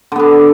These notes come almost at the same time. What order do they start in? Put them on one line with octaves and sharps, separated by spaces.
D3 B3 D4